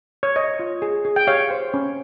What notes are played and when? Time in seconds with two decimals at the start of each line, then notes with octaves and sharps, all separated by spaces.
0.23 C#5
0.36 C#5 D#5
0.59 F4
0.82 G#4
1.05 G#4
1.16 G5
1.27 G4 C#5 F5
1.51 C5
1.74 C#4